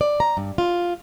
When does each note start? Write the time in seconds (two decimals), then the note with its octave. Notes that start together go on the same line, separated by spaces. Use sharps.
0.01 D5
0.20 A#5
0.37 G2
0.58 F4